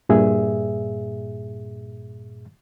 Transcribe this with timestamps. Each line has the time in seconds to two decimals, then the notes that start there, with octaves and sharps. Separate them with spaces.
0.09 G2 A#2 G#4 E5